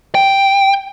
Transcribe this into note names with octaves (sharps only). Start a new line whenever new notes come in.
G5